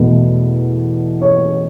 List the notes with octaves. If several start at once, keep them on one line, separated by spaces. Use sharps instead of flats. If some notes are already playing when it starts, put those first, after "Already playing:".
Already playing: E2 B2 A3 B4
C#5